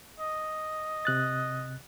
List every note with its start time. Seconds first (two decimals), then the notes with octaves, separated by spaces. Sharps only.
0.20 D#5
1.05 C3 F#6 A6